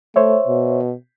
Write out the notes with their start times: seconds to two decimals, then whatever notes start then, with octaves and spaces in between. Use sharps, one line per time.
0.16 A3 C5 C#5 E5
0.48 B2